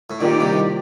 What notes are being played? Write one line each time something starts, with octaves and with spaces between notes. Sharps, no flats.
A2
A#2 D#3 A#3 D#4 G4 D5
C2 C3